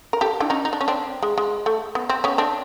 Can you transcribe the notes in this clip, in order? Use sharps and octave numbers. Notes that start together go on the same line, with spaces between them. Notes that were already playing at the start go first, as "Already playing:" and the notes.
A#4
G4 A4
D4 E4
C#4 D#4
D#4
D4
C#4
C4 D4
G#3
G#3
A3
B3
C4
B3 C#4
C4 D4